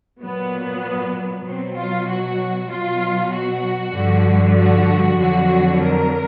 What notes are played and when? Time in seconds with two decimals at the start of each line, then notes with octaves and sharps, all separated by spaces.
0.21 A#2 F#3 B3
1.46 B2 F#3 C4
1.77 F4
2.09 F#4
2.70 B2 F#3 F4
3.33 F#4
3.95 G2 D3 F3
4.57 F#4
5.20 F2 D3 F#3 F#4
5.82 A#4